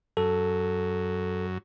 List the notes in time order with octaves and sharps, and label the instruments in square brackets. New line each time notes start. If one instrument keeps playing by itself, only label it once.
[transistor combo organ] F#2 [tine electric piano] A4